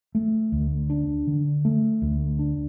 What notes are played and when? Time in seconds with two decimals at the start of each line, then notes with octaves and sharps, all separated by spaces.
0.15 A3
0.52 D2
0.90 D4
1.27 D3
1.65 A3
2.02 D2
2.39 D4